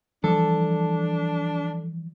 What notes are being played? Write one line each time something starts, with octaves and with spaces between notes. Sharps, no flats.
E3 F3 G3 D4 A4